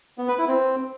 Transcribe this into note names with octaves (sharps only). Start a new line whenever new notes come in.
B3
B4
E4
C4